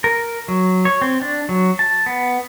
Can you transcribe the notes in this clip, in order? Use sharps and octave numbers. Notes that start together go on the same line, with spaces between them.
A#4
F#3
C#5
C4
D4
F#3
A5
B3